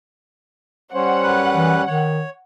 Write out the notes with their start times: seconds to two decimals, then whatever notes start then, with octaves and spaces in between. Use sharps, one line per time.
0.94 G3 C#4 C5 C#5 F#5
1.24 F#2 B4 F#6
1.53 E3
1.88 D#3 C#5